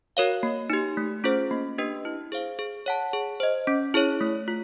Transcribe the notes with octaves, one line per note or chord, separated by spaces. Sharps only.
F#4 A#4 C#5 F5
A#3
D#4 G4
A3
C#4 F4 G#4 C5
A#3
D4 G4 B4 D#5
E4
G#4 C5 F5
G#4
C#5 F#5 A5
G#4
C5 D#5
C#4
E4 G#4 C#5
A3
F4